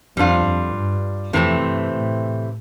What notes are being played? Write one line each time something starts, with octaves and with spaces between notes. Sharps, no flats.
F2 G3 D4 F4
F2
G2
F2 C3 E3 A3 C4
G2
A2